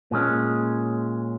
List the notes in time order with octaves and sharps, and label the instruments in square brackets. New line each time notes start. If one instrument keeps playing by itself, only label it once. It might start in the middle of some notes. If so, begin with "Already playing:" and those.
[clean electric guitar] A#2 G#3 C#4